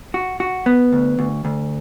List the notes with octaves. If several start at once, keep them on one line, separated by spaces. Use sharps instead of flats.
F#4
F#4
B3
D2
D2
D2